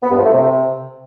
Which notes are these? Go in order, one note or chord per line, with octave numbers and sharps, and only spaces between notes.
B3
G2
F3
A3
C3